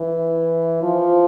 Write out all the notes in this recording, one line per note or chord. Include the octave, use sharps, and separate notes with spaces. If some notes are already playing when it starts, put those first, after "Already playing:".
Already playing: E3
F3